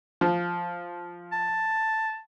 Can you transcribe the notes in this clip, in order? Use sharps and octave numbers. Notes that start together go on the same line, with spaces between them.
F3
A5